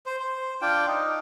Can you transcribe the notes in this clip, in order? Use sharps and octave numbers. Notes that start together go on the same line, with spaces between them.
C5
C5
D4 F4 G5
D#4